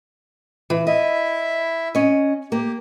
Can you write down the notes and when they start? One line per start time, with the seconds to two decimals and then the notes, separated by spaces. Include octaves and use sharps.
0.70 E3
0.87 E4 D#5 E5
1.95 C#4 D#5
2.52 A#3 G4